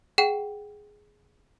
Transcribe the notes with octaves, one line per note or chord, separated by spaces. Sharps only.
G#4 F#5 G5 E7